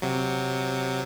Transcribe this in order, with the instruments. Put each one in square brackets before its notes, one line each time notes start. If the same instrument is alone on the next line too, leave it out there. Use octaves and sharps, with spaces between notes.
[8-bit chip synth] C3 F#3